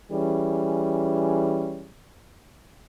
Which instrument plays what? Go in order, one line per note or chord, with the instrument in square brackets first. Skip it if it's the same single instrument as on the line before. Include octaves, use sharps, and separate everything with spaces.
[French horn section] E3 G3 C#4 G#4